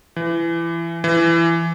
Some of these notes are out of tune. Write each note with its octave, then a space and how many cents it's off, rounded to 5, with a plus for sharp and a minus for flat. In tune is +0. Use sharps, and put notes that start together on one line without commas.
E3 +25
E3 +20